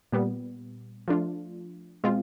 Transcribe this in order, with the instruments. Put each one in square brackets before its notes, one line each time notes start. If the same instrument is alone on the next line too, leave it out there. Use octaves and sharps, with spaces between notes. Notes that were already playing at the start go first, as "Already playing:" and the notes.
[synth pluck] A#2 G3 B3
F3 A3 D4 F4
B2 G#3 C4 F4